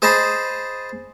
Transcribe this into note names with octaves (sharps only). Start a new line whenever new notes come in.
G#4 C5 D#5 A5 B5 D#6